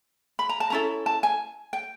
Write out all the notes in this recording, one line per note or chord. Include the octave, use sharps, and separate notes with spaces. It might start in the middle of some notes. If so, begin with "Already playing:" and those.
B5
A#5
A5
C#4 E4 A4 A#5
A5
G#5
G5